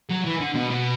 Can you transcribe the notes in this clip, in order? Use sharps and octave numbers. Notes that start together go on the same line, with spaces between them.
F#3
E3
D3
B2
B2